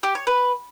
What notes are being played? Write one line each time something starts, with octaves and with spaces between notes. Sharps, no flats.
G4
C#5
B4